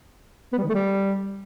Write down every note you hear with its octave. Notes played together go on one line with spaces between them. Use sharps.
B3
G3
D#3
A3
G3